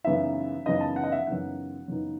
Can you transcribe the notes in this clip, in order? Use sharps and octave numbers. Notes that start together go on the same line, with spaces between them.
F#2 C#3 E3 B3 D#4 E5
F#2 C#3 E3 B3 D#4 D#5
A5
F#5
D#5
E5
F#2 C#3 E3 B3 D#4 F#5
F#2 C#3 E3 B3 D#4